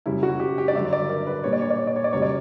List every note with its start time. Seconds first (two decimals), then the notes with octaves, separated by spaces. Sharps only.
0.06 F#2 C#3 G3 E4
0.23 F#4
0.40 G4
0.58 G4
0.68 D5
0.75 G2 D3 F#3 E5
0.93 D5
1.09 A#4
1.27 B4
1.44 A#2 G3 C#5
1.53 D5
1.61 C#5
1.70 D5
1.79 C#5
1.87 D5
1.96 C#5
2.04 D5
2.13 F#2 C#3 G3 C#5
2.22 D5